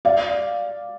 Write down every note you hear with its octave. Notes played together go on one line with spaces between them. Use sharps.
D5 F5